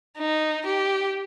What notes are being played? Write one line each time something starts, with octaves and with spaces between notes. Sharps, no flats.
D#4
G4